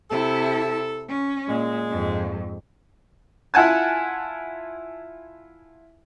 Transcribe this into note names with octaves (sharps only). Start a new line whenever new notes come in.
C3 E4 A4
C#4
A#2 G#3
F2 G#2
E4 F4 F#5 G#5 A5